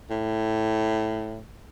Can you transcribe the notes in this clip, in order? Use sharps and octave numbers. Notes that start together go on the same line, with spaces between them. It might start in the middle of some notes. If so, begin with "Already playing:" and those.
A2